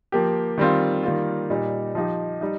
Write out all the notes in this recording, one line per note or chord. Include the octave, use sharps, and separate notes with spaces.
F3 A#3 G4
D#3 G3 C4 F4
D#3 G3 A#3 F4
A#2 G3 D#4
F3 D#4 G4
G3 D#4